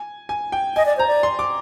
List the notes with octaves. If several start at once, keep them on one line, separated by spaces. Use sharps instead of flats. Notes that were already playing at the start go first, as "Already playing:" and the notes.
Already playing: G#5
G#5
G5
D#5 G#5
D5
C5 A#5
D5
C6
D6